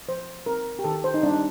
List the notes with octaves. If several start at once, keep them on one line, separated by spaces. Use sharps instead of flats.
F3 C5
C4 A#4
G4
D#3 A4
C5
D#4
G3 C4 D4